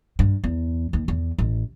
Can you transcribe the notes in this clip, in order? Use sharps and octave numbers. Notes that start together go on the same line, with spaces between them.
G2
E2
D#2
E2
A1